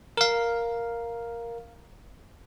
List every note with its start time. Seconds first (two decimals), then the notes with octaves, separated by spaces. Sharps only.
0.17 A#4 F5